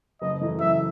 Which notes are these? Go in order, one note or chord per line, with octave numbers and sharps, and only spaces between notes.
F#1 D#5
F#2 E3 A3 E4
F#1 E5